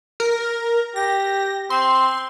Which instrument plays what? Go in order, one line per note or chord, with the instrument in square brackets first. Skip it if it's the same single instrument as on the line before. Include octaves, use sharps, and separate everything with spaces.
[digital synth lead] A#4
[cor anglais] G4 [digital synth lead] A#6
[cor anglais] C4 [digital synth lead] C6